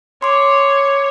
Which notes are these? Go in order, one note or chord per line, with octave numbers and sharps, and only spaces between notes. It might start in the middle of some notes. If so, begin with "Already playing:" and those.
C#5 C6 D6